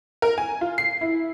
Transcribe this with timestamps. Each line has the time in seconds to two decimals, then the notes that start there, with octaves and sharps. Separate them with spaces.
0.22 A#4
0.38 G#5
0.61 F4
0.78 C7
1.01 E4